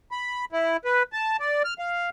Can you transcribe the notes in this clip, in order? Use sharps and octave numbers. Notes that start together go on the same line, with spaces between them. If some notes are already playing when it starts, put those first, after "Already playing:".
B5
E4
B4
A5
D5
F6
F5